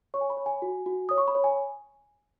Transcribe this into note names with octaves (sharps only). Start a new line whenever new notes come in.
C#5 C#6
G#5
B5
C#5
G#5
F#4
F#4
C#5 D#6
C#6
B5
C#5
G#5